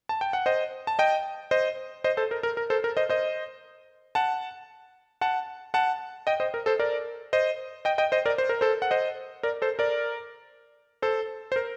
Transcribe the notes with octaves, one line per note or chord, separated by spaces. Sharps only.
A5
G5
F#5
C5 D#5
A5
D#5 G5
C5 D#5
C5 D#5
A4 C5
A#4
A#4
A#4
A4 C5
A#4
C5 D#5
C5 D#5
F#5 A5
F#5 A5
F#5 A5
D#5 G5
C5 D#5
A#4
A4 C5
A#4 D5
C5 D#5
D#5 G5
D#5 G5
C5 D#5
A#4 D5
C5
A#4
A4 C5
F#5
C5 D#5
A#4 D5
A4 C5
A#4 D5
A4 C5
C5
A#4